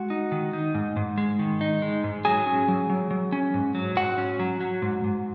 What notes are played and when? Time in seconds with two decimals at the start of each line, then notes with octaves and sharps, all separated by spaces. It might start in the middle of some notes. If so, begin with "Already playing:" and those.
Already playing: G#3 F#4 F#5
0.10 D#4
0.32 D#3
0.53 D#4
0.75 G#2
0.96 G#2
1.18 G#3
1.39 D#3
1.61 D#4
1.82 G#3
2.04 G#2
2.25 F#3 G#4 G#5
2.46 C#4
2.68 F#3
2.90 F#3
3.11 F#3
3.32 C#4
3.54 G#2
3.75 F#3
3.96 G#2 F#4 F#5
4.18 C#4
4.40 F#3
4.60 F#3
4.82 G#2
5.04 G#2